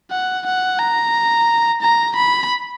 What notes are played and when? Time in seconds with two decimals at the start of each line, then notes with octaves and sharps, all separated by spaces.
0.11 F#5
0.46 F#5
0.79 A#5
1.82 A#5
2.16 B5